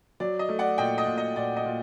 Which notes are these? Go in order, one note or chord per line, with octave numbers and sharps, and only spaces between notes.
F#3 D5
D#5
A3
D5 F#5
A#2 D#5 G5
D#5
A#2
D#5
A#2 D5
D#5
A#2